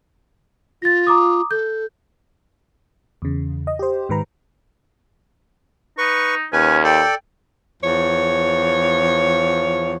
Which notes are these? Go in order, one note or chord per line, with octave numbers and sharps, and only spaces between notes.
F4 A6 A#6
A#5 D6 D#6
A4 G6
E2 C#3
D#5
G4 C5
G#2 D#3 B4 A#5
D#4 B4 C#6
D#2 C#4 B4 G#5
A4 D5 G5
E2 F3 C#5